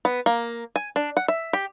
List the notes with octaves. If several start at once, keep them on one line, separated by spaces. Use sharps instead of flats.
B3
A#3
G#5
D4
F#5
E5
G4